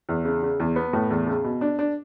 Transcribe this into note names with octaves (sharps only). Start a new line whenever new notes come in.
E2
C#3
C#3
E2
B3
A2
E2
C#3
B2
D4
D4